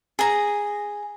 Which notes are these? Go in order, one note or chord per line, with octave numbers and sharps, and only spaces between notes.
G#4 A#5